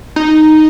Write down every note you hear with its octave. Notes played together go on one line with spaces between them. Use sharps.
D#4